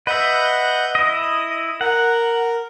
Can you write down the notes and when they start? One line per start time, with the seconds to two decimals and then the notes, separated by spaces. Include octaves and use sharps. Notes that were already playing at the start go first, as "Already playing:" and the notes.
0.07 B4 D#5 E5 F#5 G6
0.95 E4 D#5 D#6
1.81 A#4 F#5